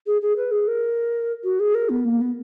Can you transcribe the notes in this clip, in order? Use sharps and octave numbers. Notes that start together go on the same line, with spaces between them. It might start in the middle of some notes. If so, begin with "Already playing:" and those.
G#4
G#4
B4
G#4
A#4
F#4
G#4
A#4
B3
A#3
B3